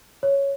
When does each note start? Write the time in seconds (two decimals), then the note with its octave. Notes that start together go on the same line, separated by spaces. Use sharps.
0.23 C#5